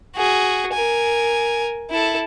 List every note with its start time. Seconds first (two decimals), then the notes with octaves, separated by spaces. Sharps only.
0.16 F#4 G#4
0.73 A#4 G#5
1.90 E4 A4